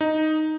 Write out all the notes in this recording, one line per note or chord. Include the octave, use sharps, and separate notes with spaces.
D#4